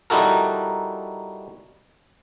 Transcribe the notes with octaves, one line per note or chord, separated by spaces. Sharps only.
G3 D#4 E4 F#4 A4 A#4